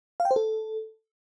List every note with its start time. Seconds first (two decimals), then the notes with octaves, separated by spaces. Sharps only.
0.20 F5
0.25 G5
0.31 C5
0.36 A4